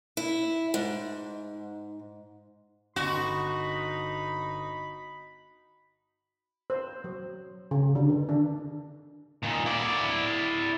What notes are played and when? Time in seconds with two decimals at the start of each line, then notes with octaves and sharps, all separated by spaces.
0.17 E4
0.74 G#2
2.96 G1 D#4 F#4 B5 C6
6.70 C5
7.04 F#3
7.71 C#3
7.95 D3
8.09 D#3
8.29 D4
9.43 A#2 D#3
9.66 E4 D5